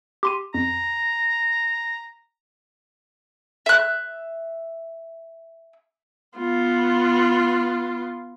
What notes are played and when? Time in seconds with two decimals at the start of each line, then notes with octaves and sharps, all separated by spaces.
0.23 G4 C6 D#7
0.54 F2 A#5
3.66 E5 F#6
6.38 B3 F4